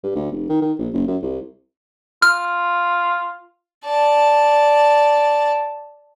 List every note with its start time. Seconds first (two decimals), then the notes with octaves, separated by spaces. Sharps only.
0.04 G2
0.15 D2
0.32 F1
0.49 D#3
0.62 D#3
0.79 A#1
0.93 F#1
1.07 F#2
1.22 C2
2.22 F4 F6
3.85 D5 A5